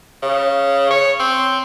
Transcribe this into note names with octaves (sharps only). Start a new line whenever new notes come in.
C#3
C#5
C4